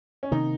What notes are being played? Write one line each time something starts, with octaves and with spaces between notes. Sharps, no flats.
C#4
C3 D#3 A#3 D#4